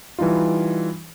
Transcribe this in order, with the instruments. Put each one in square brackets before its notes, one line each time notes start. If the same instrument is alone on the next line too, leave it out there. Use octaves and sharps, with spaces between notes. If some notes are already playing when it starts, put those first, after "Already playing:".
[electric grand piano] E3 G3 D#4 F4